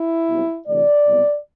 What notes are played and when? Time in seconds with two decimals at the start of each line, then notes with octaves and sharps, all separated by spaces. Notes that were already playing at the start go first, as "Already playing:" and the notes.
Already playing: E4
0.29 B1 B2 G3 C4
0.68 D2 C3 E3 A3 D5
1.06 C2 B2 F#3 B3